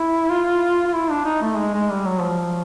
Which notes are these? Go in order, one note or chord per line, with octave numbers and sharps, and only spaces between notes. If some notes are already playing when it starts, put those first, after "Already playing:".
Already playing: E4
F4
F4
E4
D4
D#4
A3
G#3
G#3
G3
F#3
F3